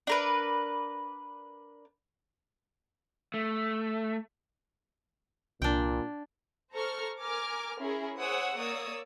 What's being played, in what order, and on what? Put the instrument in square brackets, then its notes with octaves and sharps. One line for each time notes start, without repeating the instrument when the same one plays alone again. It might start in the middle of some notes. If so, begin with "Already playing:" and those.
[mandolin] D4 A#4 B4
[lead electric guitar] A3
[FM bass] C2 [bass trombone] A#2 [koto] D4 G5
[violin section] A4 C5 A#5 C#6 F6
A#4 G#5 D6 F6
C#4 E4 G#4 A#4
G#4 C5 C#5 F#5 D#6 E6
A#3 C#5 D5 D#6 E6